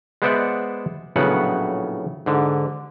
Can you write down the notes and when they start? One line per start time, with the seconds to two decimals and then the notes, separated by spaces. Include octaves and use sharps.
0.22 G#3 B3 C5 D5 E5 F#5
1.16 A#1 A2 C#3 F#3 B3 F#5
2.26 G#2 D3